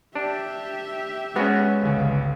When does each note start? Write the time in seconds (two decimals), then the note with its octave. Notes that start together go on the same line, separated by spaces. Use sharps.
0.15 D4 G4 E5
1.36 G#3 B3 C#4 F#4
1.82 G1 C#2